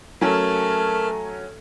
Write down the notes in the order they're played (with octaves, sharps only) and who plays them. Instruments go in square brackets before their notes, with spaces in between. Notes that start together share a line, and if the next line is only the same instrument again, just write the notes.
[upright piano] F#3 C#4 [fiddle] A3 [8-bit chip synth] A#4 A5 F6